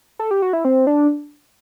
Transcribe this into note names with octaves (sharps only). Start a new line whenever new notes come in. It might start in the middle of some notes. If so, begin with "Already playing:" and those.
A4
G4
F#4
E4
C4
D4